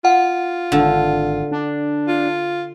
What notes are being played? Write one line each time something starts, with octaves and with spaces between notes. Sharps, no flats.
F4 F#5
G#1 D3
D4
F4